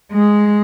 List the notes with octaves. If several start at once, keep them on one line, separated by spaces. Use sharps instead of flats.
G#3